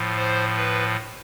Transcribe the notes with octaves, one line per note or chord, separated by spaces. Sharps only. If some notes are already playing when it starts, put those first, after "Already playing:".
Already playing: A2 F3
C5
B4